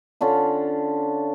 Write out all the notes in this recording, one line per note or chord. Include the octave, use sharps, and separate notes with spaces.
D3 C#4 D4 F4